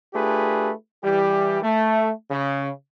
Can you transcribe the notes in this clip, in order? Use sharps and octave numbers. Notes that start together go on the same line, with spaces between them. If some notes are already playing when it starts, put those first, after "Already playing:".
A3 D4 F4 G4 G#4 B4
E3 G3 G4
A3
C#3